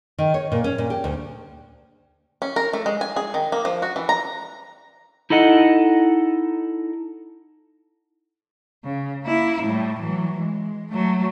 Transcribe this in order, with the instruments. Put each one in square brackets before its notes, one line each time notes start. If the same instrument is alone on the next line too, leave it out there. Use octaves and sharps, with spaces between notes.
[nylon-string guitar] D#3
C#5
A#2
C#4
A#2
G4
D2
[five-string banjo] C#4
A#4
A3
G#3
G#5
G#4
D#3
A#3
F3
F#4
E3
A#5
[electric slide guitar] D#4 E4 A4 D#5 F#5
[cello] C#3
A#3 E4
A2 G3
E3 F#3
G#3
F#3 A3